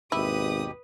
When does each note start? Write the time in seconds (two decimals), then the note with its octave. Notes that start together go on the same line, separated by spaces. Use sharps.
0.12 G#1 D#2 B2 E4 G4 B4 D#6